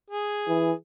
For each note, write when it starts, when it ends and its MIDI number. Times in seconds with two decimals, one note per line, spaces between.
0.11 0.72 68
0.48 0.72 52